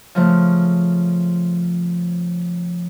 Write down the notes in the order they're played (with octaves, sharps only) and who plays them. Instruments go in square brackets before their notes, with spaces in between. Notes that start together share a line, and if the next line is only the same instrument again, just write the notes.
[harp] C#3 F3 A3